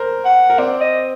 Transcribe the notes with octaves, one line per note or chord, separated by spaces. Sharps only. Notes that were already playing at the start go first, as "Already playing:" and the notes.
Already playing: A#4 C5
F#5
A#4
C4 C5 D5
D#5